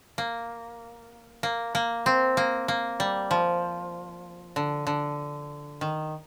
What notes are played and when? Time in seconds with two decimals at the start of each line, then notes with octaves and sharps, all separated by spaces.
0.18 A#3
1.43 A#3
1.75 A#3
2.06 C4
2.37 A#3
2.68 A#3
3.00 G3
3.31 F3
4.56 D3
4.87 D3
5.81 D#3